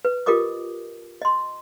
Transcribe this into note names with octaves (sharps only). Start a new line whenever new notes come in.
B4
F4 G4 A#4 D#5 D6 D#6
D#5 C6